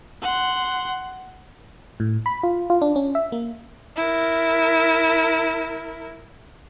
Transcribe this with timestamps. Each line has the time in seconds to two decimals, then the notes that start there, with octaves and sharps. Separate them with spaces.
0.22 F#5 C6
2.00 A2
2.26 B5
2.43 F4
2.70 F4
2.82 D4
2.96 C#4
3.15 E5
3.32 A#3
3.96 E4 A#4